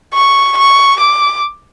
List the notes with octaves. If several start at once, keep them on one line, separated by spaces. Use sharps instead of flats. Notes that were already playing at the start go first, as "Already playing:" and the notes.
C#6
C#6
D6